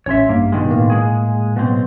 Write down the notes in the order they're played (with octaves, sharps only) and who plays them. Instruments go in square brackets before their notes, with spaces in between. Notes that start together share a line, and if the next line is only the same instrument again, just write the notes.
[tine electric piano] A1 C#4 C6 [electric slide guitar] C#5 E5
[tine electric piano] G2 [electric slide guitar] A#3
[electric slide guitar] B2 D#3 G#3
[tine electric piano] A2 A#3
[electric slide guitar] G#3 G#4
B2 F#3 C4